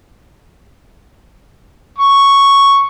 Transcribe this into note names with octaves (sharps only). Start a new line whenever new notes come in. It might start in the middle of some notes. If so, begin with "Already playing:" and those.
C#6